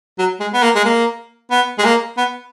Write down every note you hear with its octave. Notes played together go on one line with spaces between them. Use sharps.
F#3
G#3
B3
A#3
G#3
A#3
B3
G#3
A#3
B3